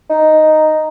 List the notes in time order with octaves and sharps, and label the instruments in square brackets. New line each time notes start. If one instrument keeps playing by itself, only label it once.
[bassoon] D#4